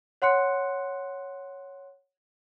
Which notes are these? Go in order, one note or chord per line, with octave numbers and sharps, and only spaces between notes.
C#5 F#5 C6 F#6 C#7